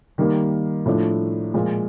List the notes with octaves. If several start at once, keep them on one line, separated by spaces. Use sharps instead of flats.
D#3 G3 A#3
A2 F3 A3 D4
A#2 F3 G#3